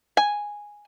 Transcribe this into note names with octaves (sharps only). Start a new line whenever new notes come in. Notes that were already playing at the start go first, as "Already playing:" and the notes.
G#5